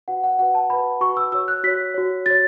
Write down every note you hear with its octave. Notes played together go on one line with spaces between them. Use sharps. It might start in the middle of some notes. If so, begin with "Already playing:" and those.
F#4 B4 F#5
F#5
F#4 B4 F#5
A5
F#4 B4 B5
F#4 B4 C#6
E6
F#4 C#5 E6
F#6
F#4 C#5 B6
F#4 C#5
F#4 C#5 A6